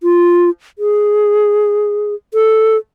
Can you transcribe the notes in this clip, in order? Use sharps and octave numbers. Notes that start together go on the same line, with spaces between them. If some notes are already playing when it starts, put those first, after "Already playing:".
F4
G#4
A4